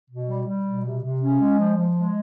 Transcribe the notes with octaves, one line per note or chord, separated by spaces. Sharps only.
B2
G3
G3
B2
C3
C3
C#4
G#3
F3
F3
G#3